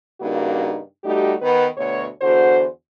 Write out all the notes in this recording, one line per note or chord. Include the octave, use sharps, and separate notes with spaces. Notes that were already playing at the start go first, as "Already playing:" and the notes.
G2 C#3 A#3 D#4 F#4
G3 A3 D#4 F#4 G4
D#3 B3 B4
D2 B2 C#5
E2 D3 F#4 C5